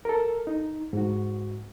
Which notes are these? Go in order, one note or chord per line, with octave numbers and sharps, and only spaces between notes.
A4 A#4
D#4
G#2 F#4